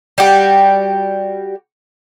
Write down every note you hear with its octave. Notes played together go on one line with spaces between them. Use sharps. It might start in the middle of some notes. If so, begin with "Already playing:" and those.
G3 F#4 G4